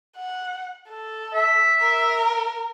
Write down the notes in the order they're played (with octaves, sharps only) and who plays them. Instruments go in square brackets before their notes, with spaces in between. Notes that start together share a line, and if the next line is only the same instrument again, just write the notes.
[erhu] F#5
A4
[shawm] E5
[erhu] A#4